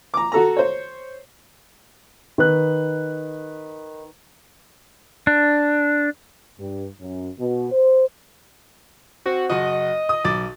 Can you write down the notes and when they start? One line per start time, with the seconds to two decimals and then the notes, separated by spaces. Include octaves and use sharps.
0.14 A#5 D6
0.32 F#4 A4 A#5
0.56 C5 C#5
2.38 D#3 B4 F#6
5.27 D4
6.59 G2
7.01 F#2
7.39 B2
7.72 C5
9.26 C4 F#4
9.50 F#1 F#4 D#5
10.09 D#6
10.25 B1 D6 A6